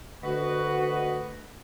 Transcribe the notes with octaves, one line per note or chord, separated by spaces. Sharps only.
D2 F#4 B4 D#5